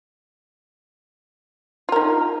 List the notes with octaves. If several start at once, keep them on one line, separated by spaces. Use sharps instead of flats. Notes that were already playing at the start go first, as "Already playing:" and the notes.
D#4 F4 A#4